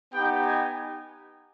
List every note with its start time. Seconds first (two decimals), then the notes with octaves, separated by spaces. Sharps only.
0.13 B3 D#4 G4 G5
0.45 G#5